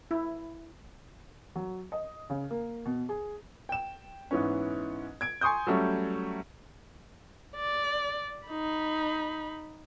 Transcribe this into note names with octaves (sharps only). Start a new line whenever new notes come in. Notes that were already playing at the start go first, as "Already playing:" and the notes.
E4
F#3
D#5
C#3
A#3
B2
G#4
G5 E7
G#2 E3 B3 C#4
G#6 D7
G#5 C6 C#6 D#6 G6
F#3 G3 A3 C#4
D5
D#4 B5